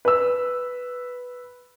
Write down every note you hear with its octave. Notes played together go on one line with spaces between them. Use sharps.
B4 E6